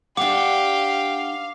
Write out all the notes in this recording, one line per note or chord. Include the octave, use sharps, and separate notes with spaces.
D4 G4 F5 F#5 D6